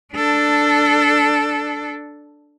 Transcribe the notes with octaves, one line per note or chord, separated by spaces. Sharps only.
D4 A4